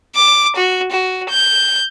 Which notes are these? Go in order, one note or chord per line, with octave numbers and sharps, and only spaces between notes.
D6
F#4
F#4
G6